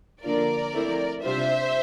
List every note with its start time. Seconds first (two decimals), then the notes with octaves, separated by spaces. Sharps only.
0.23 D3 F3 A#3 D4 F4 A#4 D5
0.73 F3 A3 C4 E4
1.23 C3 G3 D4 F4 C5 E5